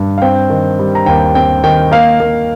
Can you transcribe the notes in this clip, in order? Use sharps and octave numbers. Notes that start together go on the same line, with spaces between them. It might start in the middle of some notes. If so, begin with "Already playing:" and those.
Already playing: G2
F5
C4 G5
D#3
G3
A#5
D#2 G5
C4 G5
D#3 G5
A#3 F5
A#3